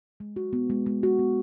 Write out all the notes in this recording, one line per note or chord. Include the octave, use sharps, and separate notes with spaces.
G#3
F#4
B3
G#3
G#3
F#4
B3